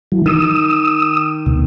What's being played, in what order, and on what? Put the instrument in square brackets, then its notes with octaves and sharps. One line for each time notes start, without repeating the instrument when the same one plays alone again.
[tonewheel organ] E3 F#3
[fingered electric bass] D#3 [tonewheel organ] D#6 E6
[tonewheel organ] D2 B2